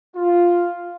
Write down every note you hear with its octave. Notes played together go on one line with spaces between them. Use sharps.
F4